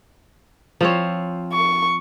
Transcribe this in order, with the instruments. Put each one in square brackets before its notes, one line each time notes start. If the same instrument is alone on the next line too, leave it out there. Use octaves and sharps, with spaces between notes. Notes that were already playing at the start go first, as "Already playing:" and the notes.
[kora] F3 C4 C#5
[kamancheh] C#6